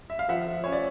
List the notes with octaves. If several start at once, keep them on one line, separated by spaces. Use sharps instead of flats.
E5
F5
F3 E5 F#5
F3
C#4 C#5
D5